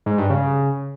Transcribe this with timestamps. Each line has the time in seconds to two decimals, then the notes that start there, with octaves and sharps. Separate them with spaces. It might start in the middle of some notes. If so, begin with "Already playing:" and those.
0.06 G#2
0.18 G2
0.30 C#3